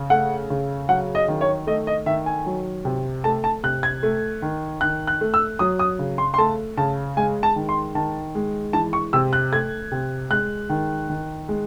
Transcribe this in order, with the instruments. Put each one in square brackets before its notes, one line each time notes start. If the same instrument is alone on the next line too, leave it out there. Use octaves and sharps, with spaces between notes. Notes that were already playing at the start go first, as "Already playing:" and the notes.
Already playing: [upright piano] C#3
A3 F#5
C#3
F#3 F#5
D#5
D#3
C#5
A3 D#5
D#5
D#3 E5
G#5
F#3
C3
A3 A5
A5
C3 F#6
G#6
A3
D#3
D#3 F#6
F#6
A3
E6
F#3 D#6
D#6
C#3
C6
C6
A3 A5
C#3 A5
G#3 G#5
A5
D#3
C6
D#3 A5
G#3
E3 A5
C#6
C3 E6
F#6
A3 G#6
C3
G#3 F#6
D#3
D#3
G#3